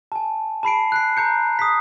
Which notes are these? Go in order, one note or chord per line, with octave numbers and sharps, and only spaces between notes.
G#5 A5
A5 B5 C7 D7
F#6 C7
A#5 G6 C#7
D#6 B6